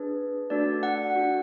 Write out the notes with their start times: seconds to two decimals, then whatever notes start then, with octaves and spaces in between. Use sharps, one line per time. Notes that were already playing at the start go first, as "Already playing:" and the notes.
Already playing: D4 G#4 B4
0.50 A3 D4 F#4 A4 D5
0.83 F#5
1.15 D4 F#4 A4